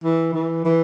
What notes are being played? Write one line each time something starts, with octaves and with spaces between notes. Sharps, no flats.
E3
E3
E3